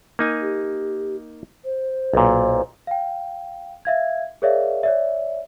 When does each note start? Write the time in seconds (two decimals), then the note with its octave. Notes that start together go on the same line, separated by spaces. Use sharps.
0.19 A#3 D#4 G#5
0.41 G4
1.65 C5
2.13 B1 A#2
2.87 F5 G5
3.85 E5 F5 G#6
4.42 G#4 A#4 C#5 D5 E5 F5
4.83 C#5 D5 E5